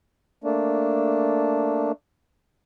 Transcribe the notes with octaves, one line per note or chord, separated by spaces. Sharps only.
A3 A#3 D4